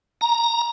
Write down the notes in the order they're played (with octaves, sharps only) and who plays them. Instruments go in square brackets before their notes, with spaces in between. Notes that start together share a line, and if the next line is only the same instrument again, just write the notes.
[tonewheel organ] A#5